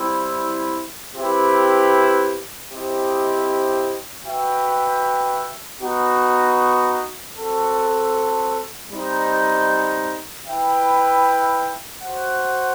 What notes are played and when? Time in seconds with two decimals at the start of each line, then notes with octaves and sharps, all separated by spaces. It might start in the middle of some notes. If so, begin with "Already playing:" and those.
Already playing: G3 C4 E4
1.13 C4 E4 G4 B4
2.68 C4 E4 G4 C5 D#5
4.24 F#4 B4 E5 G5
5.79 B3 D#4 F#4
7.35 C4 F#4 A4
8.90 G3 C4 D#4
10.45 E4 B4 E5 G5
12.01 F#4 C5 F#5